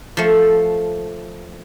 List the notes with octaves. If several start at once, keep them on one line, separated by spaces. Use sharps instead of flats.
F3 A3